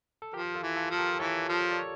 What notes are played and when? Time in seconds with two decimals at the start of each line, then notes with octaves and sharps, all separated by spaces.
0.22 A4
0.33 F3 G4 A#4
0.55 F4 A4
0.63 E3
0.76 F4 A4
0.90 F3 A4
0.98 G4 A#4
1.19 E3 A4 C#5
1.49 F3
1.71 D5
1.79 C#5